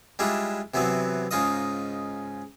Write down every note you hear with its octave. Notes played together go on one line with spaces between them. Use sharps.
G3 G#3 D4 E4 F4
C3 E3 F#3 B3 C4
G#2 C#3 D#4 F4 D#5 D#6